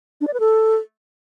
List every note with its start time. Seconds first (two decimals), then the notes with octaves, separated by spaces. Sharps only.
0.21 D4
0.27 D5
0.34 B4
0.40 A4